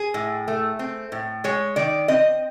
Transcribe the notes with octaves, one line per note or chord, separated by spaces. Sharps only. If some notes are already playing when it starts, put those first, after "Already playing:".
Already playing: G#4
A2
A3
C4
A2
G#3 C#5
D#3 D5
C4 D#5